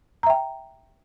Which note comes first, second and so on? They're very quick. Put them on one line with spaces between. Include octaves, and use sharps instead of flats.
A#5 E5 G5